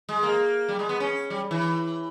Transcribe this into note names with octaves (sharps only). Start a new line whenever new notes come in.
G#3
A#3
G3
G#3
B3
C#4
G3
E3